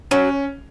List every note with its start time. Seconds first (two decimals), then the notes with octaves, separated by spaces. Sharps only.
0.11 F#3 C#4